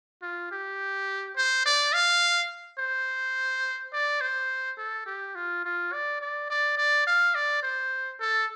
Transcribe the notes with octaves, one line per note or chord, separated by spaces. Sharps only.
F4
G4
C5
D5
F5
C5
D5
C5
A4
G4
F4
F4
D5
D5
D5
D5
F5
D5
C5
A4